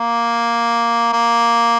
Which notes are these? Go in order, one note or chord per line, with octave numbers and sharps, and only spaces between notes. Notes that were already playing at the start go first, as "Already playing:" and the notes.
Already playing: A#3
A#3